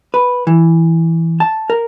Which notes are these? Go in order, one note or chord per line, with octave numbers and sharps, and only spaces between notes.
B4
E3
A5
A#4